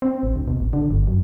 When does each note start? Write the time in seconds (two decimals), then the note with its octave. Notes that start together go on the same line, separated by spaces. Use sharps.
0.02 C4
0.23 A1
0.36 D2
0.48 B2
0.60 A1
0.73 D3
0.91 G1
1.07 F#2